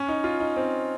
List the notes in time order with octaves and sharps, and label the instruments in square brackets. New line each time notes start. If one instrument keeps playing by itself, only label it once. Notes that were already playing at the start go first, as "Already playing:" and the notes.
Already playing: [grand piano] C#4
D#4
F4
D#4
C4